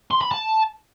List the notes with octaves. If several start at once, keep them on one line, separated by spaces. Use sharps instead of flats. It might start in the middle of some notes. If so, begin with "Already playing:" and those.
C6
B5
A5